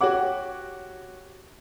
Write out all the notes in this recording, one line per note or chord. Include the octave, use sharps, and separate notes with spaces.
F#4 G4 C#5 F#5 D6